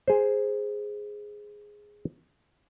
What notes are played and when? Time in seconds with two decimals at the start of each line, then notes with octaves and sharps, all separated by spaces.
0.08 G#4 C5